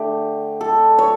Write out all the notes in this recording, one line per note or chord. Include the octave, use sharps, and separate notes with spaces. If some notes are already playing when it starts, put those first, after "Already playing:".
Already playing: D3 A3 G4
A4
C#5